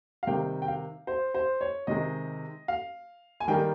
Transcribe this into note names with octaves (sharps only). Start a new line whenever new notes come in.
F5
C3 D#3 G3 A#3 G5
G5
F5
C5
C5
C#5
C3 D#3 G#3 D#5
F5
G#5
D#3 G3 A#3 G5